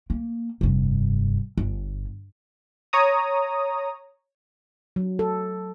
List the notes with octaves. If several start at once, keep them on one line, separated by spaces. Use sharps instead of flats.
A#3
F1 G2
G1
C#5 A#5 D#6
F#3
A4